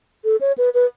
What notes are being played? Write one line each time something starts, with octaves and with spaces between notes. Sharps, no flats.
A4
C#5
B4
B4